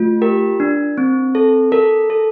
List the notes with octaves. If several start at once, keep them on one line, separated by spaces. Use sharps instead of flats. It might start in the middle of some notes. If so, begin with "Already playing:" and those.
Already playing: A3 F4
G4 A#4
D4
C4
A4
A4 A#4
A4